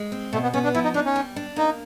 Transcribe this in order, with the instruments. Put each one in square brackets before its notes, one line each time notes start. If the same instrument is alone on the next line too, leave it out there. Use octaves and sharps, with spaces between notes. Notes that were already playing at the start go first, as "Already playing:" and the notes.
Already playing: [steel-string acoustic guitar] G#3
C4
[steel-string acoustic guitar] B2 [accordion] A3
[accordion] B3
[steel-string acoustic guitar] B3 [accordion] C#4
[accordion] D4
[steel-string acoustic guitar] F3 [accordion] E4
[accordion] D#4
[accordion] D4 [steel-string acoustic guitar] D#4
[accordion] C#4
[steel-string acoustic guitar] G3
D4
[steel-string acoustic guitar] A#3 [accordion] D#4